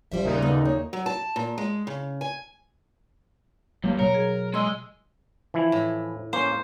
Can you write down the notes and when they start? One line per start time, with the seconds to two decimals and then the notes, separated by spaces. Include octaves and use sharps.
0.12 A1 F3 G3 C5 E5
0.24 D#2 A#2 C#3 A#3 D#4
0.42 A3 B3
0.65 A#3 C#5
0.93 F#3
1.06 A5
1.36 A#2
1.58 G#3
1.87 C#3
2.21 G#5
3.84 G2 F#3 A#3
3.99 B2 F#3 A#4 C#5
4.14 G#4
4.54 G#3 D#5 C6 E6
5.54 E3 F3 E4
5.72 A2
6.33 A#3 C#4 C5